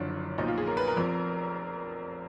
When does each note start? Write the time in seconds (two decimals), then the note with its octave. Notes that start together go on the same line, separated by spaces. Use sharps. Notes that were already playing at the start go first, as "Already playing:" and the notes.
Already playing: F#1 F#2 D3 F3 D4
0.38 B1 A#2 F3 D#4
0.48 F4
0.58 G#4
0.67 A#4
0.77 B4
0.87 A#4
0.97 F1 F2 F3